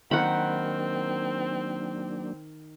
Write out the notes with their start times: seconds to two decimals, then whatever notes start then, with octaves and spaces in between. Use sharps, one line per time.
0.11 D#3 F#3 A#3 C4 D4 F#5 B5